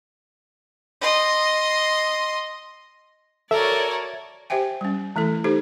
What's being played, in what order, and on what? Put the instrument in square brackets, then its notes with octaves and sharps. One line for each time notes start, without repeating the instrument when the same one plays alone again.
[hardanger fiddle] D#5 C6
[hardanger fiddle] F#4 A#4 [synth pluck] A4 [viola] C#5 D5 [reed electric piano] E5
[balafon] G4 C5 E5 G5 G#5
G3 C#4
E3 A3 E4 A4
D#4 G4 A4 C5